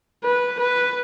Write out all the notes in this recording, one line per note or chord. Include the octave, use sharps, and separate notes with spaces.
B4
B4